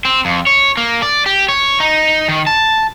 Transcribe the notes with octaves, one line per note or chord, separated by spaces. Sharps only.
C4
F2
C#5
A#3
D5
G4
C#5
D#4
D#3
A5